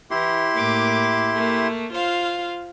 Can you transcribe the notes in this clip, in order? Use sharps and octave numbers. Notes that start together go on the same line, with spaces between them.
E3 E4 G4 C6
A2 A#3 D6
A3 A#3
F4 C5 F5